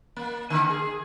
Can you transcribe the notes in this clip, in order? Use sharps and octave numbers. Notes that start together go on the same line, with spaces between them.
A#3
D3
G#4